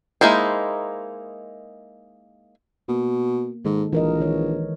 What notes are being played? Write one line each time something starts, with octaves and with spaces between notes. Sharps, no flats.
G#3 A#3 D#4 E4 C5
B2 A#3
G#2 D#3 G#3 A4
A#1 E3 A#4 D#5
D#3 C#5 D#5